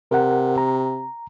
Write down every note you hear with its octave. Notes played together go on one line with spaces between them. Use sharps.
C3 A#4 F#5
A#5